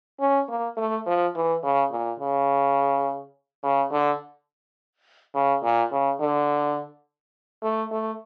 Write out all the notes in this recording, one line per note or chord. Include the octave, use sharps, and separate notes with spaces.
C#4
A#3
A3
F3
E3
C#3
A#2
C#3
C#3
D3
C#3
A#2
C#3
D3
A3
A3